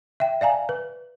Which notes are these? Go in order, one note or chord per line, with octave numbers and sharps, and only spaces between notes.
E5 G5
D5 F5 G#5 A#5
B4